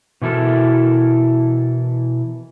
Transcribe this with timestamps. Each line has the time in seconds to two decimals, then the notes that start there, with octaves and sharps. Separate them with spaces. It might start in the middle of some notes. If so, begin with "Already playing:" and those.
0.22 B2 E3 E4 A4 A#4